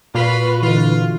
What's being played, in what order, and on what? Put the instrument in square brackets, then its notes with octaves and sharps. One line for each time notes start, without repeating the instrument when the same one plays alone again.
[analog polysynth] A#2 [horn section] F4 B5 [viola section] F#4 B4
[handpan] D3 E3 [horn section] F4